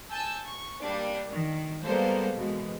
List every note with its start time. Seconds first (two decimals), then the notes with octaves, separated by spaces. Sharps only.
0.10 G#5 A5 E6 G6
0.45 C#6
0.80 G3 A#3 D4
1.30 D#3
1.84 G3 G#3 A#3 B3 A4 C5
2.36 B2 E3 G#3